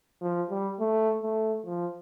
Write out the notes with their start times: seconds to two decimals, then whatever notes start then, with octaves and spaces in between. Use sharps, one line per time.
0.22 F3
0.50 G3
0.80 A3
1.23 A3
1.66 F3